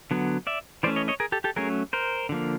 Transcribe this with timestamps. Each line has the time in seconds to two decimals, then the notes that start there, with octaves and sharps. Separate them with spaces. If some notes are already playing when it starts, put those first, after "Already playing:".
0.11 D3 F#3 B3
0.47 D5 E5
0.83 E3 A3 C#4 C5 D5
0.96 C#5 D#5
1.08 C#5 D#5
1.20 G#4 A#4
1.32 G4 A4
1.44 G4 A4
1.56 F#3 A3 C#4 G#4 A#4
1.93 A#4 C5
2.29 D3 F3 A#3